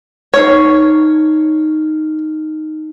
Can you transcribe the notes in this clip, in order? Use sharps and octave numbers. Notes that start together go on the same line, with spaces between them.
D#4 C#5 F6 C7